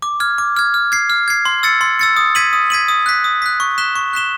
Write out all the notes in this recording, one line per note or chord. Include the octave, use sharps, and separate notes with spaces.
D6
F6 G#6
D6
F6 G#6
F6
G#6 C7
F6
G#6 C7
C6
E6 A6 C#7
C6
E6 A6 C#7
D#6
G#6 B6 D#7 F#7
D#6
G#6 B6 D#7 F#7
D#6
F#6 B6
D#6
F#6 B6
C#6
F#6 B6 E7 G7
C#6
F#6 B6 E7 G7